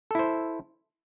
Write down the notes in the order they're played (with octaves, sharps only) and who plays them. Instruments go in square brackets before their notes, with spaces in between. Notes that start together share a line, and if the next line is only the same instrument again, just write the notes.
[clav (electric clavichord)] A4
E4
C5